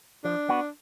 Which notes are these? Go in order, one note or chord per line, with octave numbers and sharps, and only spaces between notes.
F3 D4
B3 F#4